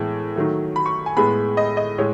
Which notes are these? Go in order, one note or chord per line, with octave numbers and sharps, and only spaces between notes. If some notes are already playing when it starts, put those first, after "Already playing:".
Already playing: A2 E3 G#3 B3 A5
D#3 F#3 A3
B5
C#6
G#5
A2 G#3 B3 B5
D#5
D#5
A2 G#3 C#5